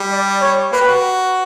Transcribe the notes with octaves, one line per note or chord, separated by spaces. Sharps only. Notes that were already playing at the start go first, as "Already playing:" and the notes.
Already playing: G3
D5
C#5
A#3 B4
G4
F#4